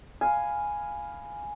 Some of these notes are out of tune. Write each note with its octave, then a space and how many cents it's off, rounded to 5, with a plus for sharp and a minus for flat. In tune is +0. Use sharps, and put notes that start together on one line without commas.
F5 +0 G#5 +0 B5 +0